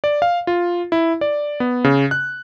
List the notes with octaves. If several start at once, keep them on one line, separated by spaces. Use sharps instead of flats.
D5
F5
F4
E4
D5
B3
C#3
F#6